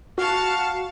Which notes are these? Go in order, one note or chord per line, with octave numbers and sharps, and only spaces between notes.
F#4 F5 A5 C#6